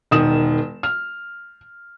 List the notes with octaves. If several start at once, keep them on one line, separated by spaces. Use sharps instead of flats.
E1 D#3 D#6 E7
F6